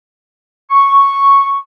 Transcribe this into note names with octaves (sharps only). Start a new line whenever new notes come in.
C#6